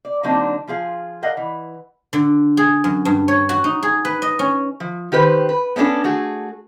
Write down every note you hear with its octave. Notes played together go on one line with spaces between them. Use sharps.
D5
D3 F#3 A#3 C4 D4 D#4
F3 F4 G#4 F5
A#4 D5 D#5 F5 F#5
E3
D3
G#4
F#2
G2
C#5
F#4
D#4
G#4
B4
D#5
C#4
F3
D#3 G4 B4 C5
B4
B3 C#4 D4 F#4 A4
A3 F#4 G#4